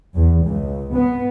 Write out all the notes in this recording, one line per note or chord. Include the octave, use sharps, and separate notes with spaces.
E2
C#2
B3